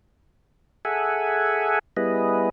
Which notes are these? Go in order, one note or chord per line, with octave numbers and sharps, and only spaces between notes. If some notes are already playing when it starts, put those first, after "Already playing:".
G#4 A4 E5 F#5 G#5
G3 B3 E4 G#4 B4 D#5